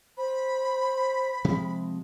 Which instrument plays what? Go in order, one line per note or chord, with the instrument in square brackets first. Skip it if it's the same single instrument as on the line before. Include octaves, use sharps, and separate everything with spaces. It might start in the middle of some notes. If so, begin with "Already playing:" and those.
[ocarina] C5 [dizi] B5
[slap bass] C3 F3 G#3